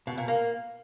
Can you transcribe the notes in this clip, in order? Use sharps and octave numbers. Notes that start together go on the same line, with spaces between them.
B2
A#2
A#3